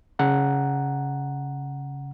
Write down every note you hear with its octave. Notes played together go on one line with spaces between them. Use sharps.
C#3 F#5 A#5